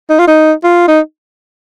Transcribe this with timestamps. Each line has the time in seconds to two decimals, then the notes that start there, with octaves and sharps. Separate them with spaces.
0.10 D#4
0.19 F4
0.27 D#4
0.64 F4
0.88 D#4